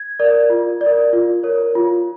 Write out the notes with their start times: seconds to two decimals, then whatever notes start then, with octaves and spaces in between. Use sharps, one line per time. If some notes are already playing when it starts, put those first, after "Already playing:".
Already playing: G#6
0.20 A#4 D5
0.50 F4
0.81 D5
0.86 A#4
1.13 F4
1.43 A#4 C#5
1.75 F4